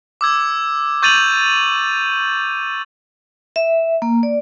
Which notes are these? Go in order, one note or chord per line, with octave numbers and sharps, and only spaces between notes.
D6 E6 G#6
C#6 G6 A6 D#7 F7 F#7
E5
A#3
D5